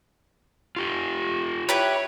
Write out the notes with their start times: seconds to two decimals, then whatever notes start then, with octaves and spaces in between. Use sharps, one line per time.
0.76 F4 G4
1.69 E4 G4 B4 C#5